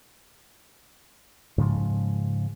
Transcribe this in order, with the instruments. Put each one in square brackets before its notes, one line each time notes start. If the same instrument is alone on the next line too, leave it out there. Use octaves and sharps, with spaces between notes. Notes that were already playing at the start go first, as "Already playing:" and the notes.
[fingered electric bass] G#2 C#3 F3 G#3